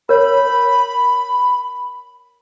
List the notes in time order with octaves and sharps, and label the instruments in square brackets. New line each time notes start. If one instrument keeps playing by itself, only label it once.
[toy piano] A#4 C#5 [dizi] B5